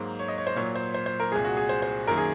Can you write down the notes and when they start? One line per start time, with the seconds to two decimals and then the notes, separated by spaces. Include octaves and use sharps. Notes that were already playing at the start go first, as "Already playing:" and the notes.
Already playing: G#2 F#3 A#3 C5
0.19 C#5
0.28 D#5
0.38 C#5
0.47 C5
0.56 A#2 F#3 A#3 C#5
0.76 C5
0.94 C5
1.06 C5
1.20 A#4
1.32 C2 A#2 G#3 G#4
1.45 F#4
1.57 G#4
1.69 C5
1.82 C5
2.07 F#2 D#3 A#3 A#4
2.18 G#4